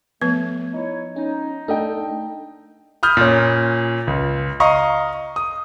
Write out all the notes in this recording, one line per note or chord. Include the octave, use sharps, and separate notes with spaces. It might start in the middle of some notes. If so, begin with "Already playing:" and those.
F3 A3 B3 B4
D#4 E4 C#5
C#4 D#4
A3 D4 A4 D#5 G5
B5 D#6 F6 G6
A#2 C#4
C#2
D#5 F5 A#5 C#6 D#6
D#6